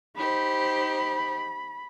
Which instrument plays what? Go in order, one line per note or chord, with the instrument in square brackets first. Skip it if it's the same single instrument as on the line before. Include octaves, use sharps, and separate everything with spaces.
[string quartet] D#4 G4 C5 [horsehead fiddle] B5